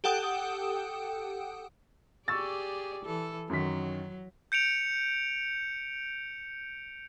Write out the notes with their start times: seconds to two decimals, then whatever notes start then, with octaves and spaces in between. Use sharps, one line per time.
0.04 G4 A4 F#5 G5 D#6
2.28 G4 G#4 D5 C#6 E6 A6
3.05 E3 A4
3.50 F#2 D#3 F#3 B6
4.52 G6 C#7 D7 F7